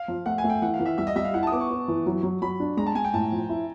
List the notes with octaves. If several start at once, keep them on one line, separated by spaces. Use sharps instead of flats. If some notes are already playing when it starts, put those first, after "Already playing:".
Already playing: F5
F3
A3 F#5
G#5
A3
G5
E3 F#5
F5
E3
E5
G3 E5
D#5
G3 E5
F5
E4 F#5
A5 D#6
B3 D6
C#6
B3
E3
F#3
F#3
F#3 B5
D4
G#3 A#5
A5
G#3 G#5
G5
A2 A5
F3
E4